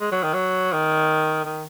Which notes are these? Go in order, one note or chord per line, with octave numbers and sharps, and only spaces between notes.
G#3
F#3
D#3
F#3
D#3
D#3